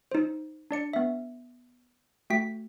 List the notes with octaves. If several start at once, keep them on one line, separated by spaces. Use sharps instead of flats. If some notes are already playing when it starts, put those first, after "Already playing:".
D#4 C5
D4 D5 C#7
B3 E5
A3 F#4 G5 B6